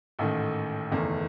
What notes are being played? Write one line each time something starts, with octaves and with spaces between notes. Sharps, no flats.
A1 G#2 D#3 A3
F#1 E2 D#3 A3